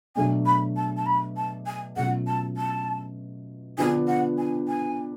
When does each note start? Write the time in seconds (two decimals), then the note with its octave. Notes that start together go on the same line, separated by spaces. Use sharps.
0.16 B2 F#3 A3 D4 G#5
0.46 B5
0.76 A5
0.97 A5
1.06 B5
1.37 A5
1.66 G#5
1.96 B2 F#3 A3 C#4 F4 F#5
2.27 A5
2.57 A5
3.78 D3 F3 B3 D4 G#5
4.07 F#5
4.38 G#5
4.68 G#5